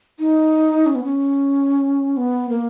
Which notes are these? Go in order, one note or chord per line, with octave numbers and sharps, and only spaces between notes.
D#4
C#4
B3
C#4
B3
A#3